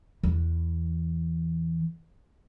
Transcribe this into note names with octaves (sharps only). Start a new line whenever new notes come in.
E2 E3